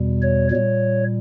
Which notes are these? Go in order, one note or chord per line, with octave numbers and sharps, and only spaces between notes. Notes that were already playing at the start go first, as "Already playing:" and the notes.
Already playing: E2 B2 G3
C#5
A#2 G3 C#5